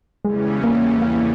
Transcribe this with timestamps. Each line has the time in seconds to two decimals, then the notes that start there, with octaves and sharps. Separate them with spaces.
0.24 E2 C#3 E3 G3 G#3 C#4
0.64 A#3
1.02 A#3